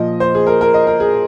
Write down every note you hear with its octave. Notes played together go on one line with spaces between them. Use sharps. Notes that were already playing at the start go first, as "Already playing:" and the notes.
Already playing: A#2 F3 D#5
C5
G#4
A#4
A#4
D#5
A#4
G#4